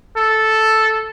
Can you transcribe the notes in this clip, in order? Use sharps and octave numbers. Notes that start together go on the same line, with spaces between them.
A4